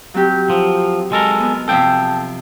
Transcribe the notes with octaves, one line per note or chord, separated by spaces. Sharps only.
F#3 C4 G4
F3
G#3 A4 A#4
B3
C3 F3 C4 A4 G5